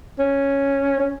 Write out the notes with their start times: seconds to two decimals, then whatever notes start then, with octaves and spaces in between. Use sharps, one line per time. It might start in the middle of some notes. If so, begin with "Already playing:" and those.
0.19 C#4
1.00 C#4